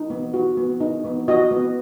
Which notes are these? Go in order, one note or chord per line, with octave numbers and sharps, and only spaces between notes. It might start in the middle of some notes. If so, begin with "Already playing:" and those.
Already playing: D#4
B3
F#4
B3
D#4
B3
F#4 D#5
B3